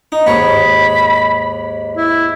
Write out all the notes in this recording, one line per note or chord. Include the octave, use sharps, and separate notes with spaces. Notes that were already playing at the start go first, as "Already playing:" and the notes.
D#4
D#2 G#2 C#5 B5
E4